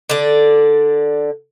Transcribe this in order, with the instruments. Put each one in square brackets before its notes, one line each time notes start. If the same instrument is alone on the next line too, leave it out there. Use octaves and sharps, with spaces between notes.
[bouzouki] D3 D5